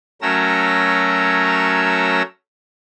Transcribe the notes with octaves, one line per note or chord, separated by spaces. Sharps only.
F#3 A3 C#4 A#4 A#5 E6